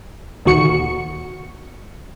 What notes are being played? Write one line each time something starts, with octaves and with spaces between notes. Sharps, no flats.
D2 A#2 D#3 F#4 C#6 C#7